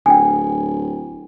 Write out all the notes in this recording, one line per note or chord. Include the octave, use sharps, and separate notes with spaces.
D1 G5 G#5